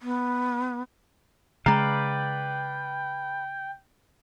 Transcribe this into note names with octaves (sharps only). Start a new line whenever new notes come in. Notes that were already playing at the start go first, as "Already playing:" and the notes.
B3
C#3 G#3 B4 D5 F5 G5 A#5